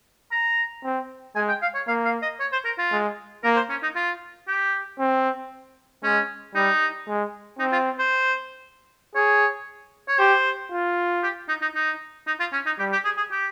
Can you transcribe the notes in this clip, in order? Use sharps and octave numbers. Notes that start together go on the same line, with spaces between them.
A#5
C4
G#3 G#5
G5
F5
C#5
A#3 F5
F5
D#5
C#5
C5
A#4
F4
G#3
A#3 A#4
C5
C#4
D#4
F4
G4
C4
G#3 C#4
G3 D#4
G#3
C4 D#4
F4
C5
G#4 C#5
C#5
G4 C5
F4
G4
D#4
D#4
D#4
D#4
F4
C#4
D#4
G3 G4
G4
G#4
G#4
G4